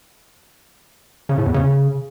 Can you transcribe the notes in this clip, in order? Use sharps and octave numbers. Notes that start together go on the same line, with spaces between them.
C#3
A2
E2
C#3